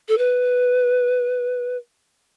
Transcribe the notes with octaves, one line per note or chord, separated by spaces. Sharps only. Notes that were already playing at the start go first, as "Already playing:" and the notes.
A4
B4